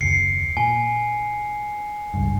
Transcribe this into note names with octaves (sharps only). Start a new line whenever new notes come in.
F#1 D#2 C7 C#7
A#2 G#5
G#1 C#2 G2